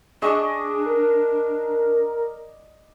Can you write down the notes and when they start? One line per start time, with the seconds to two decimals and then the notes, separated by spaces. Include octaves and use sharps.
0.22 D4 G#4 D5 D#5 C#6
0.86 A#4